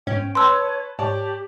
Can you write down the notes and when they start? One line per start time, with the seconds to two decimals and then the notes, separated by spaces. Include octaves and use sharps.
0.07 G1 G#2 C#4 G5
0.35 B4 C#5 A5 C6 E6
0.99 G#2 G4 C#5 D5 A5